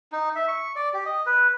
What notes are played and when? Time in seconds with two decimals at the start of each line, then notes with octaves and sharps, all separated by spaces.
0.12 D#4
0.36 E5
0.48 C#6
0.76 D5
0.94 G4
1.06 D#5
1.26 B4